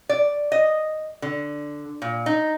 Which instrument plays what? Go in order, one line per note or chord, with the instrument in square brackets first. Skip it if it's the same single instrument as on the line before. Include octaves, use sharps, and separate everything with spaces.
[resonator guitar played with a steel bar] D5
D#5
D3
A#2
D#4